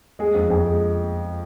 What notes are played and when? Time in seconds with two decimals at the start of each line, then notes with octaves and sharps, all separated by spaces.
0.19 G#3 G#4
0.35 F2
0.49 F2 G#4
0.64 G#3